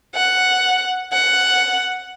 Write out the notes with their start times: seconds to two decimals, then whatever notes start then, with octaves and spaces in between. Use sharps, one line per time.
0.15 F#5
1.13 F#5